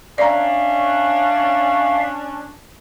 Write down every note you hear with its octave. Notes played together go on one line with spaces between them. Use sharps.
C#4 D4 D5 E5 F5 A#5